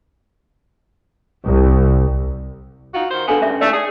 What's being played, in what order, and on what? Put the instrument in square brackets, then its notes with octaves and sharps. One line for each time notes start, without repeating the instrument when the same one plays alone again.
[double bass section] C2
[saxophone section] D#4 F4 F#4
D#3 C5
[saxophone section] D3 A#3 B3 [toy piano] D4 A4 G#5
[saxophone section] G2 [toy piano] C#4 E5
[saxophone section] A3 [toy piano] D#4 D5
[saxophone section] G#4